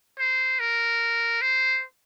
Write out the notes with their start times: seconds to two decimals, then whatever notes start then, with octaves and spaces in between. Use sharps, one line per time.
0.18 C5
0.60 A#4
1.42 C5